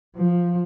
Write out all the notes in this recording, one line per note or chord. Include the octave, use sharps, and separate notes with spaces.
F3